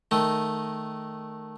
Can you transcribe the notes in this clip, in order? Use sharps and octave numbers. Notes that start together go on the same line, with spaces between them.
D#3 A3